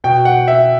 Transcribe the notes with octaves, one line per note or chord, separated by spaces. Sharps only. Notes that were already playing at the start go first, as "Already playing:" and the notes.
B2 G5
F#5
E5